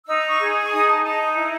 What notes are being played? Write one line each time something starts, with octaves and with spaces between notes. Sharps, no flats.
D#4 E6
C#6
G#4
C#6
D#4 D#6
A5
D#4 A5
E4